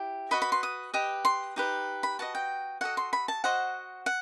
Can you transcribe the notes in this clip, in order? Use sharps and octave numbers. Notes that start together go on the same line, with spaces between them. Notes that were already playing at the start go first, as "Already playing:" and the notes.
Already playing: E4 G4
F#4 B4 D#5 B5
B5
C6
D#6
G4 B4 D#5
C6
D#4 G4 B4
B5
F#4 B4 D#5 A5
G5
F#4 A4 D#5 F#5
C6
B5
A5
F#4 C5 D#5 F#5
F#5